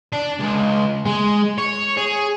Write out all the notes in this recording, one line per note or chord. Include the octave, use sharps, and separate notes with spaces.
D4
C#2
G#3
C#5
G#4